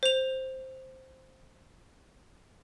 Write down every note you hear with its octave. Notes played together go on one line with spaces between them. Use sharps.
C5 F7